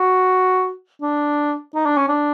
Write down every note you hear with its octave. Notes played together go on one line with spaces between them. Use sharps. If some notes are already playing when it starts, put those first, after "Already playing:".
Already playing: F#4
D4
D#4
D4
C#4
D4